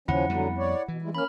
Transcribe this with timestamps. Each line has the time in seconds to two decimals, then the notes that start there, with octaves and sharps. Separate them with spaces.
0.08 D#2 C#3 F3 C#4 E4 F#5
0.29 F2 D3 F#3 G3 B3
0.58 C#5 D5
0.88 B2 E3
1.02 G3 G#3 E4
1.15 A#3 C#4 B5 F6